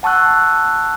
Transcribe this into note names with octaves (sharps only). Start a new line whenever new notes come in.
F#5 A5 C#6 E6 F#6